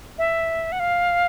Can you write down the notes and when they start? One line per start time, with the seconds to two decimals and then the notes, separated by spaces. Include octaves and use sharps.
0.18 E5
0.72 F#5
0.80 F5